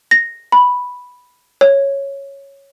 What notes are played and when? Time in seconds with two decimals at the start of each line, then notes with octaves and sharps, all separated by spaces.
0.11 A#6
0.52 B5
1.61 C#5